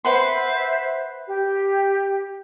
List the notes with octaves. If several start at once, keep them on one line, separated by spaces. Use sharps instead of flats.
B4 C5 E5 F#5 C6
G4